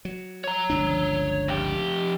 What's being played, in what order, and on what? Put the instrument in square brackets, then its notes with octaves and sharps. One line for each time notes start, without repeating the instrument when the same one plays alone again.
[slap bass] F#3
[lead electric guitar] C#5 A#5
[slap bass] G1 C#2 D4
[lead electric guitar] F2 G4